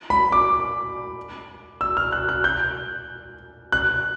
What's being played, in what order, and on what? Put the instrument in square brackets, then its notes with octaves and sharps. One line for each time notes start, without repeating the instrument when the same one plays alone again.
[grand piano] B5
D6
E6
F6
F#6
F#6
G6
F#6